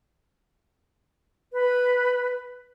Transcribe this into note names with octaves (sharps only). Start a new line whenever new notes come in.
B4